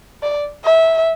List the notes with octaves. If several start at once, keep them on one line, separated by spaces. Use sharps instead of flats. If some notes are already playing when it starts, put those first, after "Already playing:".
D5
E5